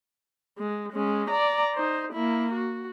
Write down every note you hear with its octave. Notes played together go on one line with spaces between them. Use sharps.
G#3
G#3 C#4
D5 A#5
D#4 C5
A#3 E4
F#4